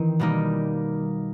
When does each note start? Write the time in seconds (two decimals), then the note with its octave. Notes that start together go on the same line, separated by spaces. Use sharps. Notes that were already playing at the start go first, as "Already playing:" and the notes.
Already playing: D#3 E3 C4
0.19 B2 G3 A#3 D#4